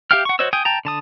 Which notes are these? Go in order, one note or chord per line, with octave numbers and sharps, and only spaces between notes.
G4 E5 F5 G5 F6
F#5 C#6
F#4 C5 C#5 D#5 E6
G5 G#5 D#6
G5 A5 A#5
D3 A5 D#6